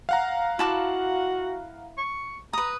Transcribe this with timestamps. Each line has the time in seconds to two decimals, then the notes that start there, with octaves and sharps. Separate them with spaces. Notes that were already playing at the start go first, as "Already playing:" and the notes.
0.09 F5 F#5 A#5
0.59 E4 F#4 A5 D6
1.98 C#6
2.53 B4 A#5 D#6